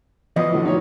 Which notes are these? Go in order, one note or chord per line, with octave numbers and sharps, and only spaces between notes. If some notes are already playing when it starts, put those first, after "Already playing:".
E3 F3 B3 D#5 D#6
A2 D3 F#4
D#4 E4 C#5